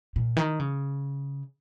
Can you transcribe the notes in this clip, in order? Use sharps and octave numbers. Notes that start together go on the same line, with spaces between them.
A#2
D#3
C#3